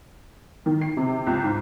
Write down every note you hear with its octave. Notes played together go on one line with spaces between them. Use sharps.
D#3
C7
C3
C#2
G#2